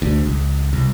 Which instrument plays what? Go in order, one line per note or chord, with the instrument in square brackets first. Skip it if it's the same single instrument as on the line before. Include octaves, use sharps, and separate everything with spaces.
[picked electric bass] D2
C#2
C2